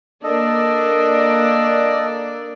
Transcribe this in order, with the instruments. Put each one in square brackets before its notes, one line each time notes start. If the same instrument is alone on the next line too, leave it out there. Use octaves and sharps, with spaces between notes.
[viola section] A#3 D4 D5 [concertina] A4 D#5